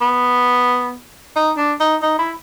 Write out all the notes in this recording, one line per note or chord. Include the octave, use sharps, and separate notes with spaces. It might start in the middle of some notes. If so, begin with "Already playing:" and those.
B3
D#4
D4
D#4
D#4
E4